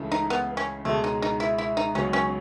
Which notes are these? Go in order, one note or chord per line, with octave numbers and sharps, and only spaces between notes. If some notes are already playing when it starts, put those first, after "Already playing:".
Already playing: C#2 C#3 E3 A3
D#4
B3
C#4
C#2 B2 G#3 A3
D#4
D#4
E4
E4
D#4
C#2 C#3 F#3 B3 C#4 D#4
C#4